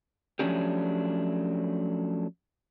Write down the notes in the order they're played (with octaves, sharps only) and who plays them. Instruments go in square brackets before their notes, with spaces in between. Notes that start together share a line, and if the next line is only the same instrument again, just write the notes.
[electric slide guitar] F3 F#3 A3 C#4 D4 G4